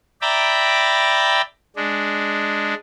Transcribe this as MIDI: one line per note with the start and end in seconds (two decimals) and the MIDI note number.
0.22 1.42 74
0.22 1.42 76
0.22 1.42 79
0.22 1.42 82
0.22 1.42 83
0.22 1.42 86
1.76 2.74 56
1.76 2.74 62